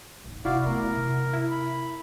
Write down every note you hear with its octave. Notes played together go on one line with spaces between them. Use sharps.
G#2 E4
C3 C4 E4 F#4 D5 F5
A3 B3 A#4
C3
E4
B5